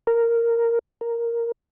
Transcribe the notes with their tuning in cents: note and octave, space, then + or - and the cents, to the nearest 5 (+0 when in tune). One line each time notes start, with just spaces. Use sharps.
A#4 -5
A#4 +0